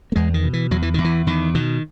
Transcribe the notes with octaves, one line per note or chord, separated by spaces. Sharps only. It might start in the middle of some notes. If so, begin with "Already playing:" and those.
A#3
E2 G#3
D#3
B2
E3
E2 F#3
E3
E2 D#3
E3
E2 D#3
B2 D#3